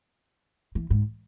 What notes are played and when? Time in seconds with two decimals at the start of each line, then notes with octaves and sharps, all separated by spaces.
0.75 E3
0.90 G#2